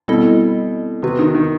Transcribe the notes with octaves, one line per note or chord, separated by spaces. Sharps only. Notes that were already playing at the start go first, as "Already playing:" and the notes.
B2 G3 C4 E4 A4 D#5
C3 B3 F#4 B4
D#3
D#3